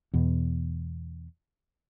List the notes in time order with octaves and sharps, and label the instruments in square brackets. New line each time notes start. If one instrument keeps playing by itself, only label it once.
[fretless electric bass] E2 B2